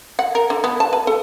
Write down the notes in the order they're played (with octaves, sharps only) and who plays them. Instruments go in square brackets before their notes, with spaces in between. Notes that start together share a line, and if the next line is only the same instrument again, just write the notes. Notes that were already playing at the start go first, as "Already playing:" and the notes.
[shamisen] F#5
A#4
D3
B3
A5
B4
A4